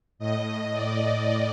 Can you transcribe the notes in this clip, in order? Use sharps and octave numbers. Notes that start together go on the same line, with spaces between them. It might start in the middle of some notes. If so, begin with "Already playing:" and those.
A2 D#5
D5